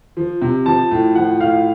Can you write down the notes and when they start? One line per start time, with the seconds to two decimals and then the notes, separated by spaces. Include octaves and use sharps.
0.17 F3
0.41 C3
0.66 F3 A5
0.91 A2
1.15 F3 F#5
1.40 A2 F5